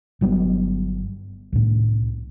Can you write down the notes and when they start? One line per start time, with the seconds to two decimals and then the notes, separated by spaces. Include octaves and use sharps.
0.21 G1 F#3 G3 B3
1.52 C2 A2